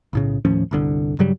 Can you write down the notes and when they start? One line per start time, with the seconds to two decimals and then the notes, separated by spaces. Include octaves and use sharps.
0.13 B1 A2 C#3
0.45 D#2 A2 F3 C#4
0.71 G1 C2 D3
1.19 G2 C#3 F#3 G3